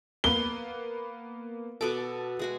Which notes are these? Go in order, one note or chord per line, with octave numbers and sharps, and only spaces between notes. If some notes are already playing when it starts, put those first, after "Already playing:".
A#3 B3 B4 G7
B2 B3 A4 D6
G#3 F#4 G#4